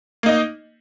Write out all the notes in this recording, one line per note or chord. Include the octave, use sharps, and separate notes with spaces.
A#3 D#4 D#5